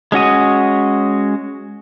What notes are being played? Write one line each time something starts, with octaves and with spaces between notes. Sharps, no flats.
G#3 C#4 F#4 D#6